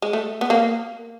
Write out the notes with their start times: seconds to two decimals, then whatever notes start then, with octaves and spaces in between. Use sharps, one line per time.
0.02 G#3
0.13 A3
0.41 B3
0.50 A#3